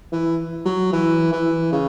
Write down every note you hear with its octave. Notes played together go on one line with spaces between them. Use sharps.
E3
F#3
E3
E3
C#3